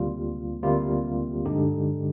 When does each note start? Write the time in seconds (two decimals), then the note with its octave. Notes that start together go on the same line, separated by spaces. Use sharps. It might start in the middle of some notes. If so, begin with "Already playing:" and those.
Already playing: D2 C3 G3 A#3 F4
0.63 D2 C3 G3 A#3 F4
1.45 G2 D3 G#3 D#4 G4